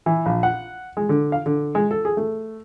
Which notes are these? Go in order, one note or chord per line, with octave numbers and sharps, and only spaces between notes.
E3
A#1
F#5
G#3
D3
F5
D3
G#3
A4
G#4
A3